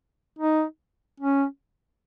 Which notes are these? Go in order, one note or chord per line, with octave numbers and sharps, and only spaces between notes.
D#4
C#4